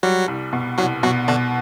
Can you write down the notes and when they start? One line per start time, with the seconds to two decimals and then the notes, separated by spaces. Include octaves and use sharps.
0.03 F#3 G3 F#4
0.28 C2
0.53 B2
0.78 C2 F#3 F#4
1.03 B2 F#3 F#4
1.28 B2 D3 D4